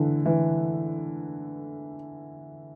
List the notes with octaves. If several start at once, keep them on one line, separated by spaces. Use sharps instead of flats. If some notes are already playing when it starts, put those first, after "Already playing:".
Already playing: D3 E3
E3